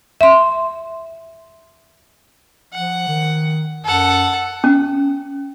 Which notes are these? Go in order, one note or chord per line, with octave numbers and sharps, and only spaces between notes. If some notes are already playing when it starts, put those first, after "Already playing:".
E5 C6
F3 F#5
D#3
F#2 A4 F#5
C#4